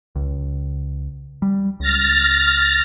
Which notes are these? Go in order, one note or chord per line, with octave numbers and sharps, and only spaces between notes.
C#2
G3
C#2 F6 A6 A#6